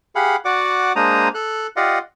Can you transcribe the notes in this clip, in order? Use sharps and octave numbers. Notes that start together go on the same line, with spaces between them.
G4 G#4 F5 F#5 B5
F#4 D5 F#5 D6
G#3 A#3 D4 C5 A#5 D#6
A4 F#6
F4 G4 D5 D#5 F5 F#5